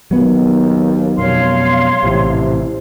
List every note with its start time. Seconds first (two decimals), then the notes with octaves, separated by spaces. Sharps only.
0.11 D#2 F#3 B3
1.18 F2 B2 C#5 F5 C6
2.03 A#1 A2 C3 E3